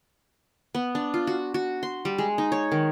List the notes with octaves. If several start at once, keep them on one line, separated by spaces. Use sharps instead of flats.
B3
D4
F4
F#4
F#4
C6
G3
G#3
D#4
C#5
D#3